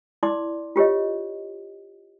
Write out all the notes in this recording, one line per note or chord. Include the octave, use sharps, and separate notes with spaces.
E4 D5 C6 D6
F4 G4 C#5 D#5